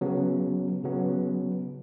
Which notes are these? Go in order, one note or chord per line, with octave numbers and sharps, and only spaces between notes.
C#3 F#3 B3
C#3 F#3 B3